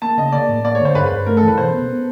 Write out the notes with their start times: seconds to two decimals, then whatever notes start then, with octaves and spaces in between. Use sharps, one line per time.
0.02 A#3 A5
0.18 C#3 D#5
0.32 A#3 D5
0.49 A2
0.65 A#3 D5
0.75 C#5
0.80 D3
0.85 C5
0.95 G2 B4
1.06 B4
1.12 G2
1.26 A3 A#4
1.37 A4
1.43 E3
1.48 B4
1.58 B2 C5
1.74 B3
1.89 B3